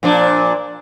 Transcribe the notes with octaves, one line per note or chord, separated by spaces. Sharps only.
A#2 F3 D4